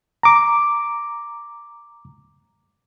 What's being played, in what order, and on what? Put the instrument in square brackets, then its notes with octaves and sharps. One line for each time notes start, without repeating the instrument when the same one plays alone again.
[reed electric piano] A#5 D6